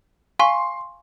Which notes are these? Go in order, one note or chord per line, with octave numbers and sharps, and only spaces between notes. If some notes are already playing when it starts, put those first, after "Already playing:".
F5 G#5 C6 C#6